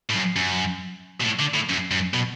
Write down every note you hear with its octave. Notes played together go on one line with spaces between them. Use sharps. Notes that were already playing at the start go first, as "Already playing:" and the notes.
A2
F#2
F#2
B2
A2
D3
A2
F#2
F#2
B2